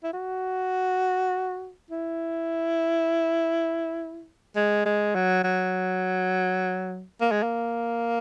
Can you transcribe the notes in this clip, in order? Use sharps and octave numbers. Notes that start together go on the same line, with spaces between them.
E4
F#4
E4
G#3
G#3
F#3
F#3
A#3
G#3
A#3